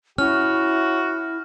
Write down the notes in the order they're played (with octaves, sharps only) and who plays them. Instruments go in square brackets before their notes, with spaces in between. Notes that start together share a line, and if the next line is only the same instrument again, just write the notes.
[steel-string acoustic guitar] C#4 [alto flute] E4 [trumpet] F#4 [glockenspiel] F6